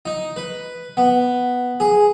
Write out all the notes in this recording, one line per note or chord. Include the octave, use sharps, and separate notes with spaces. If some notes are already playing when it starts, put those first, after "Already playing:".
D#4
B4
B3
G#4